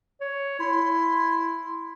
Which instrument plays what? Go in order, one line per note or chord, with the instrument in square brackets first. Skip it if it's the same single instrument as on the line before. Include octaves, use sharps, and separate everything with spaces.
[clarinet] C#5
[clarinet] E4 [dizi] C6